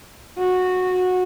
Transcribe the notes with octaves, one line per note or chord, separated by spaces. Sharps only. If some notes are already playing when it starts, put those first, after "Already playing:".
F#4